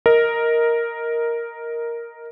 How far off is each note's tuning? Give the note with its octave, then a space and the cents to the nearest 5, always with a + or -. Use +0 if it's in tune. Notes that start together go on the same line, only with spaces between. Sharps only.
A#4 +0 D#5 +15